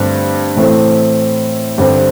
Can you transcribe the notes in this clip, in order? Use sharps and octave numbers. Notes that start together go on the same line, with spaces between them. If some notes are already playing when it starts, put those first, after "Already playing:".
Already playing: G2 D3 A3 C4
A2 E3 A3 C4
G2 D3 G3 C4